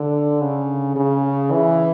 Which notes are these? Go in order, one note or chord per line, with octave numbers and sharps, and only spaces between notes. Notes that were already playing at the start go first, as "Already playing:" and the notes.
Already playing: D3
C#3
C#3
E3